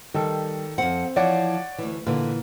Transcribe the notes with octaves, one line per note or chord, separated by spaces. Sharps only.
D#3 G3 A4
F2 C4 F#5
E3 F3 E4 C#5 D5 F#5
D2 E3
A#2 D3 E3